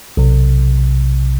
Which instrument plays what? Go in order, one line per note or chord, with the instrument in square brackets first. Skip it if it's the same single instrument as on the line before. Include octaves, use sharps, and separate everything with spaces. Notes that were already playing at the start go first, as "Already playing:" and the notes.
[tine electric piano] B1 C3